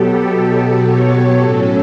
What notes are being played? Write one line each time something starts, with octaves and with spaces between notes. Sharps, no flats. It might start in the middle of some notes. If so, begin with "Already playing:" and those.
Already playing: B2 F#3 B3 G4 A4
A4
C#5
A2 F#3 C#4 A4